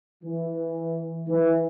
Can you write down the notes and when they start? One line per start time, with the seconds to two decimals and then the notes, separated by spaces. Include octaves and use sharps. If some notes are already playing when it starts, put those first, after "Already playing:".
0.24 E3
1.28 E3